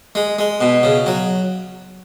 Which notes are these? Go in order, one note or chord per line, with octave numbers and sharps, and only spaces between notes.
G#3
G#3
B2
C#3
F#3